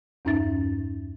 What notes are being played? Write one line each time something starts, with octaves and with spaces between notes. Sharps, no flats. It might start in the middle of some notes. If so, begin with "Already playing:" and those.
E2 G2 C#4 D#4 E5 A6